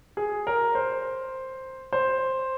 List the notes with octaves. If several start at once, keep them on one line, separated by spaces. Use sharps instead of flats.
G#4
A#4
C5
C5